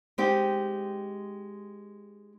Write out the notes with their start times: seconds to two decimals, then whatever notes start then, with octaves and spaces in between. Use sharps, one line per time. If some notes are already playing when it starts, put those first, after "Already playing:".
0.18 G#3 C4 D#4 G4